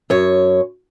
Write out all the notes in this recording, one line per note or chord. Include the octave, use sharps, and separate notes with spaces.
F#2 C#5